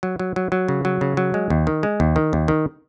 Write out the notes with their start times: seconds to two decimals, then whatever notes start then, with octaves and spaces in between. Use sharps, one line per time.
0.03 F#3
0.19 F#3
0.36 F#3
0.52 F#3
0.68 C#3
0.85 F#3
1.01 C#3
1.17 F#3
1.34 G#3
1.50 D#2
1.67 D#3
1.83 G#3
2.00 D#2
2.16 D#3
2.33 D#2
2.48 D#3